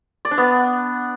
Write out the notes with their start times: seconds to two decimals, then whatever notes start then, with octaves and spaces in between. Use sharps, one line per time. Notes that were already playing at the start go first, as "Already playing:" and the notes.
0.25 D5
0.31 D4
0.38 B3